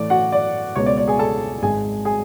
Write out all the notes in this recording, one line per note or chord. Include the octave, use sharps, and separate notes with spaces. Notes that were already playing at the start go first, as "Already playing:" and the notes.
Already playing: A2 E3 A3 D5
F#4 F#5
D5
C#2 B2 G#3 B3 C#5
D5
D5
G#4 G#5
A4 A5
G#1 G#2 G#3 G#4 G#5
G#4 G#5